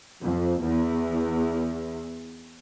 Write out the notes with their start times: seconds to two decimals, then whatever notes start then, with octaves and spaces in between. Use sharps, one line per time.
0.22 F2
0.63 E2